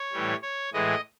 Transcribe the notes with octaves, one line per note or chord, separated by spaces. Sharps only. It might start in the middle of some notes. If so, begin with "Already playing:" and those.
Already playing: C#5
A2 E3 G3
C#5
A2 E3 G#3 D#5